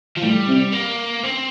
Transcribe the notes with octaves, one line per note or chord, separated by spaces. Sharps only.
F3
A2 G3
C3
A#3
C4